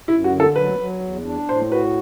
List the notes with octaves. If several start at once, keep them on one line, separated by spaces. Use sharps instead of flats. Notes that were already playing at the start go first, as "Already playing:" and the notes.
F#2 E4
F#4
D3
A4
F#3 B4
F#3
E2
D4
A2 C5
F#4 B4